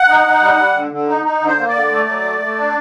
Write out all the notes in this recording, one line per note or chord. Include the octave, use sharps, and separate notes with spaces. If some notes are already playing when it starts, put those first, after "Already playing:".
Already playing: F#5
D#4
D#4
G3
G3
D3
D3
D#4
D#4
D3
C5
A#3
D5
D3
A3
F#3
A3
A3
D4